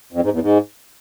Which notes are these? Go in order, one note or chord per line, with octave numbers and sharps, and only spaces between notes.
F2
G#2
E2
G#2